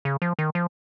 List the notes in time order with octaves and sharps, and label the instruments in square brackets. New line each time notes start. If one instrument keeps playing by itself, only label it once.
[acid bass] C#3
F3
D#3
F3